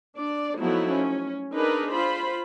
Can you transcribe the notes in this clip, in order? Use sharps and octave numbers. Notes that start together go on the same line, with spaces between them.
D4 D5
F3 F#3 A3 B3 D#4 E4
C#4
D4 D#4 G#4 A#4 B4
F4 C5 B5